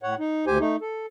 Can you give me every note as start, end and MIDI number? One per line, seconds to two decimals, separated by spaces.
0.03 0.15 45
0.03 0.15 73
0.03 0.15 78
0.19 0.45 63
0.47 0.58 38
0.47 0.58 67
0.47 0.58 72
0.47 0.58 80
0.60 0.76 57
0.60 0.76 63
0.81 1.06 69